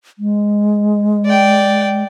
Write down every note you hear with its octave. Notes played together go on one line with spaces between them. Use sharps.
G#3
D5 G5